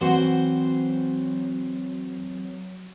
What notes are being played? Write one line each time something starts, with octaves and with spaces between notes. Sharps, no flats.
E3 F#3 C4 F#4 C5 F#5